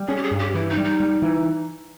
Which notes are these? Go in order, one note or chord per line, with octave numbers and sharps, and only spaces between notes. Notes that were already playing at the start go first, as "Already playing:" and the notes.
Already playing: G3
C#4 G#4
G4
G#4
G2
G4
E3 E4
D#4
G3
D#4
G3
E3